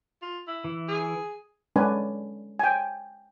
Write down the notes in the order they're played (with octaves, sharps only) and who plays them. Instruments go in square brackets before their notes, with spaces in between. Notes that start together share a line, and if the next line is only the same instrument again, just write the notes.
[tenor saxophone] F4
E4
[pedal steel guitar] E3
[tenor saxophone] G#4
[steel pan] G#3 C#4 D4 B4 G#5
G5 G#5